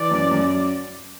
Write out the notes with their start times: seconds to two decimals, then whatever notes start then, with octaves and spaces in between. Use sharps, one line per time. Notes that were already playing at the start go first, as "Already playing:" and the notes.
Already playing: E3 D5
0.11 F#2
0.31 F#2